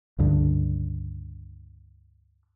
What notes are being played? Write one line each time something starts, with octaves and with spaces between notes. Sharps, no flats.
C#2 G2 D3